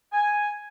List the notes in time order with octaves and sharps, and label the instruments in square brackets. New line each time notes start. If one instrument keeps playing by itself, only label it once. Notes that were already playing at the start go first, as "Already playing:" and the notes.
[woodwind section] G#5